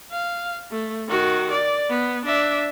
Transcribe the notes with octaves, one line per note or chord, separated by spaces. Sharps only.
F5
A3
D#3 F#4
D5
B3
D4 E5